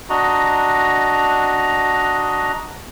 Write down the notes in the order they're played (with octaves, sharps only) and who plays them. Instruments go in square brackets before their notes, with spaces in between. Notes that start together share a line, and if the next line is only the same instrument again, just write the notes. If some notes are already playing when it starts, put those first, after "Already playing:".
[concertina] D4 F#4 D#5 A#5